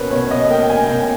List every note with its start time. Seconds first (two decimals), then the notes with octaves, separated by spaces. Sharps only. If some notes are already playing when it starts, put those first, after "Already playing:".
Already playing: B2 A#3 C#4 B4
0.11 B2 C#5
0.31 B2 D#5
0.50 A#3 G5
0.62 G5
0.70 C#4 G#5
0.89 B2 G5